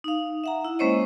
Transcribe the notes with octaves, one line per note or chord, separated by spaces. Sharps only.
D#4 F5
E5 F#5 A#5
E4
G#3 A#3 C#4 C5 C#5 D#5